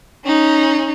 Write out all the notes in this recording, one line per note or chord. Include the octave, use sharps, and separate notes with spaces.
C#4 D#4